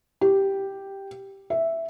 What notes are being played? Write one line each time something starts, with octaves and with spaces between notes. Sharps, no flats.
G4
E5